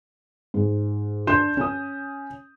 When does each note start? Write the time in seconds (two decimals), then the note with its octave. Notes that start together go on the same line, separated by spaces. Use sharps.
0.54 G#2
1.27 D4 C6 G6 E7
1.57 C#4 D#6